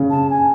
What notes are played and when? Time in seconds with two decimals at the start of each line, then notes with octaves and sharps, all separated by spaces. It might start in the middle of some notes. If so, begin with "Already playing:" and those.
Already playing: C#3
0.10 A5
0.30 G#5